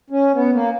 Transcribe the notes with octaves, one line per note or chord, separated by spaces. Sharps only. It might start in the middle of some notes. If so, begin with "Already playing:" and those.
C#4
B3
A#3